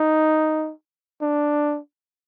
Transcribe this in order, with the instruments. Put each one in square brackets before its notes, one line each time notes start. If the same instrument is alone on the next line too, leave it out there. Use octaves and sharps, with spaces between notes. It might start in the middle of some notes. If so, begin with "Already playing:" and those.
Already playing: [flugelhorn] D#4
D4